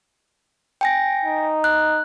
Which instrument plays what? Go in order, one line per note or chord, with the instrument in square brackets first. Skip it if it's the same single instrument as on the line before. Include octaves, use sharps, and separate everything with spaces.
[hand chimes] G5 G#5 A#6
[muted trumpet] D#4
[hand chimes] F#6